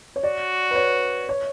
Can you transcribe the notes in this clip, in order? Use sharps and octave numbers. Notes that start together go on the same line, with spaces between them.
C#5
F#4 D5
B4
C#5
C#5